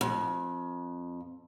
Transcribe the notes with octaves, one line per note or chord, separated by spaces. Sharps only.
F2